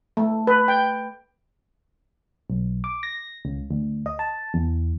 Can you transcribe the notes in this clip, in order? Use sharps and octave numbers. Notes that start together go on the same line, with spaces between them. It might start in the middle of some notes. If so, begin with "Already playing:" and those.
A3
B4
G5
B1
D6
A#6
C#2
D2
D#5
A5
E2